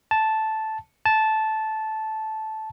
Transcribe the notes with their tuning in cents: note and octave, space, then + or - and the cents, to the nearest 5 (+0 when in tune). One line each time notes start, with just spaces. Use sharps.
A5 -5
A5 -10